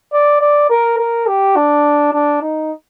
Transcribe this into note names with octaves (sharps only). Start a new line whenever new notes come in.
D5
D5
A#4
A#4
G4
D4
D4
D#4